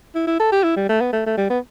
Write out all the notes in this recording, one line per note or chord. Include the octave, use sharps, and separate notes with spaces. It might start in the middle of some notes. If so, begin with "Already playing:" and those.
E4
E4
A4
G4
E4
G3
A3
B3
A3
A3
G3
B3